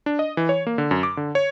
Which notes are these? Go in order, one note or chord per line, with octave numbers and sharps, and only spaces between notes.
D4
D#5
E3
C#5
A#3
D3
F#2
D6
D3
C#5